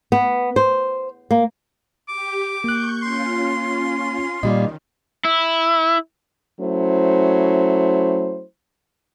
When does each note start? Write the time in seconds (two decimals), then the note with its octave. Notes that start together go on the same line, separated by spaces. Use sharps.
0.12 B3
0.56 C5
1.31 A#3
2.08 G4 D6
2.64 A#3 C#6 F#6 G6
3.03 C#4 F4 C6
4.43 A#2 D#3 G3 F4 D#5
5.25 E4
6.61 F#3 A3 C#4 E4 C5